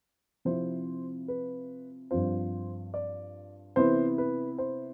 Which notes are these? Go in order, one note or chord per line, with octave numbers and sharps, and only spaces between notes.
C3 F3 C4 E4 C5
B4
G2 F3 C4 F4 C5
D5
C3 E3 B3 E4 C5
B4
C5